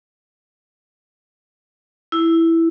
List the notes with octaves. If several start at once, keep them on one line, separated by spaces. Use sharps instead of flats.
E4